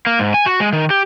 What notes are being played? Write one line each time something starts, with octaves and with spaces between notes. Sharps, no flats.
A#3
G#2
G#5
F#4
G#3
D#3
G4